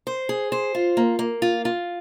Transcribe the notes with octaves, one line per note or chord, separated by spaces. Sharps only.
C5
G#4
C5
F4
A#3
A#3
F4
F4